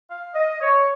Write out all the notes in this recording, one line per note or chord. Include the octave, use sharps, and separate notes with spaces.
F5
D#5
C#5